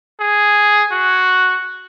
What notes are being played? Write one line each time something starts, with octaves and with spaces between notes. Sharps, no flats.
G#4
F#4